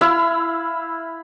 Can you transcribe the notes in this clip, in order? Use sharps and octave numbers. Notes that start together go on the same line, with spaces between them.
E4 F5 B5 E6